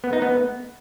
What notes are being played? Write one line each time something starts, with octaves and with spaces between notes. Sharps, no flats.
B3
D#4
B3